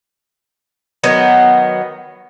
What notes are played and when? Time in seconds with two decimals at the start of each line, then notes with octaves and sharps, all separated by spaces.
1.04 D#3 F#3 B3